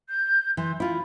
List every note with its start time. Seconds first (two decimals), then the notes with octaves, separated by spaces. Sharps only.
0.08 G6
0.57 E3 C6
0.80 E4 F4 B5